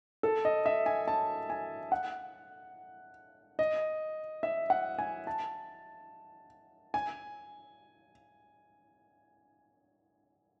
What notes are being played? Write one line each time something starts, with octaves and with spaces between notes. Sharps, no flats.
A4
D#5
E5
G#5
A5
G#5
F#5
D#5
E5
F#5
G#5
A5
G#5